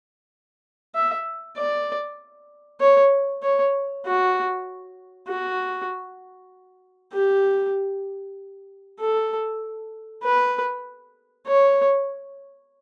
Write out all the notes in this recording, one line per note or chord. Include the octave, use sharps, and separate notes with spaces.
E5
D5
C#5
C#5
F#4
F#4
G4
A4
B4
C#5